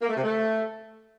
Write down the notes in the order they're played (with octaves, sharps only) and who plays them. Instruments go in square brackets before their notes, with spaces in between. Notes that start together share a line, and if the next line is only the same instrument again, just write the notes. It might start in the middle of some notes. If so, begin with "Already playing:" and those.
[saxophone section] A#3
A3
C3
A3